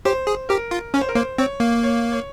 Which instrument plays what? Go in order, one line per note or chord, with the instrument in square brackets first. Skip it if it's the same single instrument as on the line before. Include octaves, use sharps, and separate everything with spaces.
[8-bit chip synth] G4 [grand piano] C5
[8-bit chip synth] G#4
[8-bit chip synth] G4 [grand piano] A#4
[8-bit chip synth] F4
[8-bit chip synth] C#4 [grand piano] C#5
[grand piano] C5
A#4
[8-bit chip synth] A#3 [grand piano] C5
[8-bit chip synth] C4 [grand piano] C#5
[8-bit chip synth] A#3
[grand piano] C#5
C#5